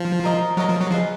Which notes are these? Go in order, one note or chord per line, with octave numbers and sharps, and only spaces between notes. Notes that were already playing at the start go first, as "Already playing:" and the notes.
Already playing: F3
A#4 D#5 A#5
F#3 A#4 D#5 A#5
F3
F#3
F3 G#4 B4 D#5